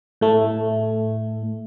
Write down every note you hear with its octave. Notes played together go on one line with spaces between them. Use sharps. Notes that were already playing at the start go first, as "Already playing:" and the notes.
A2 A3